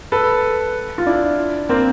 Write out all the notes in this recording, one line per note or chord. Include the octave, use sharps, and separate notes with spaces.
A4 B4
F4
D4 E4
A#3 C4